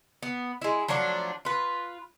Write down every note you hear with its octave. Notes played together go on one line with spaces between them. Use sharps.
B3
G#3 E4
F3 F#3 A3 D4
F4 B4